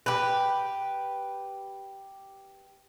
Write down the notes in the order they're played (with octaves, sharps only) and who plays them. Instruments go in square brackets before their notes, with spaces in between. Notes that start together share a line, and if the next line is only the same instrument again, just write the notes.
[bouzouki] G4 B4